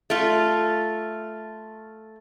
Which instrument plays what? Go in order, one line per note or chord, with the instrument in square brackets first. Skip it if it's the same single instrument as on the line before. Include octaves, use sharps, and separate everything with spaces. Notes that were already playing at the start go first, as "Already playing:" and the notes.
[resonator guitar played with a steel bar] A3 F4